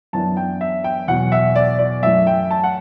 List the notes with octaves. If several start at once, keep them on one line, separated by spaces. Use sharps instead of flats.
F#2 E3 B3 D4 A5
G5
E5
G5
E2 B2 F#3 F#5
E5
D5
D5
F#2 E3 A3 E5
G5
A5
F#5